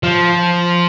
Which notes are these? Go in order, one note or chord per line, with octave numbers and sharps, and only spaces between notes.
F3